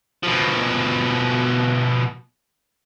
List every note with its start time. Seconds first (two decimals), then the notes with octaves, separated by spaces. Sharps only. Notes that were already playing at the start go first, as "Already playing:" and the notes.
0.23 B2 F3